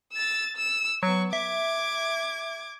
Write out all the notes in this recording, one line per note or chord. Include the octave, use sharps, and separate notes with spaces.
E6 A6
E6
F#3 B3 C#6
E5 D6 G#6